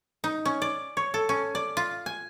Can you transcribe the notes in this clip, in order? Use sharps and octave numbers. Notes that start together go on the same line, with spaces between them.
D#4
C#4
D5
C#5
A4
C#4
D5
F4
G#5